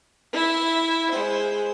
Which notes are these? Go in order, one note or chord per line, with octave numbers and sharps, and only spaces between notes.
E4 E5
G#3 C5